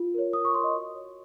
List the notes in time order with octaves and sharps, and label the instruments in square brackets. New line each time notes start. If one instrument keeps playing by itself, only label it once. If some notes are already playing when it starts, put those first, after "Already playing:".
Already playing: [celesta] F4
A#4 C#5
F4 D#6
C#6
A#4 C#5 C6
D#5
F#4
C#5